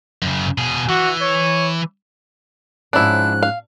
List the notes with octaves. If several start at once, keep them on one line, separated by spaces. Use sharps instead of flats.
F#2 C#3
B2 G#4
E3 F#4
C#5
G#2 F3 C#4 D4 E4 F#6
F5